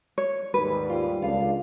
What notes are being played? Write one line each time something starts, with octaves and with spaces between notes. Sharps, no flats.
C#5
D#2 G#2 G3 B4
F4 G4
C#2 D3 D4 F4 F5